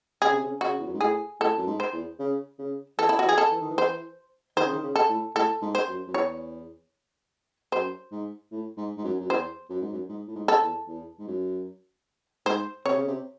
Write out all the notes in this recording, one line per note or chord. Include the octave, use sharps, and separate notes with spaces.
C#3 G#4
C3
C#3
C#3 F#4
E2
F#2
G#2
A2 G#4
A2 A4
F#2
G#2
C5
E2
C#3
C#3
E3 A4
E4
F#4
E3
G#4
A4
E3
D#3
E3
C5
D#3 C5
C#3
D#3
C#3
A4
A2
A2 A4
G#2
C5
F#2
F#2
E2 C#5
F#2 C5
G#2
A2
G#2
G#2
F#2
F#2
E2 C5
F#2
G#2
F#2
G#2
A2
G#2
A4
E2
E2
G#2
F#2
G#2 C5
C3 C#5
C#3
C3